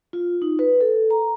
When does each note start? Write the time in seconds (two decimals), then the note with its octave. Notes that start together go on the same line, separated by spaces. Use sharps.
0.13 F4
0.42 D#4
0.59 B4
0.81 A4
1.10 A#5